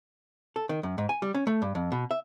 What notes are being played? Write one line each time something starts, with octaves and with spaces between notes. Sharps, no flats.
A4
D#3
F#2
G#2
G#5
G3
C#4
A3
G2
F2
B2
E5